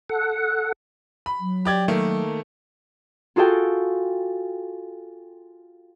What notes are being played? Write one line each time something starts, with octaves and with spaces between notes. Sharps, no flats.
A4 F#5
B5
F#3
G4 D5 G#6
D#3 A3 A#3
F4 F#4 G#4 A4 F5 G5